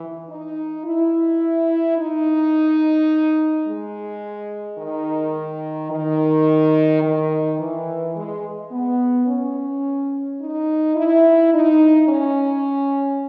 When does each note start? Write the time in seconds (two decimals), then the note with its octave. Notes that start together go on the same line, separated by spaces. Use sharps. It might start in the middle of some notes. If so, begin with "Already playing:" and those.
Already playing: E3
0.28 D#4
0.85 E4
1.98 D#4
3.66 G#3
4.78 D#3
5.91 D#3
7.02 D#3
7.59 E3
8.15 G#3
8.71 B3
9.27 C#4
10.40 D#4
10.95 E4
11.53 D#4
12.08 C#4